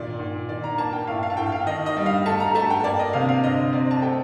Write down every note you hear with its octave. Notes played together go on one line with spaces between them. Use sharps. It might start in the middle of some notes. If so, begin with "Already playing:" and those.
Already playing: A#2 D#3 D5
A#2
D#3 D5
A#5
A#3 A5
G5
A2 F5
F5
A5
A2 G5
F5
D#3 D#5
D#5
G3
F5
A3 A5
A#5
A3 A5
G5
A#3 D5
D#5
C3 F5
F5
D3 D#5
C4 D5
A5
A3 G5